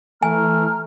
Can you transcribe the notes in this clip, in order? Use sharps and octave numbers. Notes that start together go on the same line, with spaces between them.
E3 A3 G#5 A#5 F6